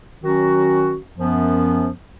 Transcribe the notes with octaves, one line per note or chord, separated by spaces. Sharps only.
D#3 F#3 C#4 F#4
F#2 F3 B3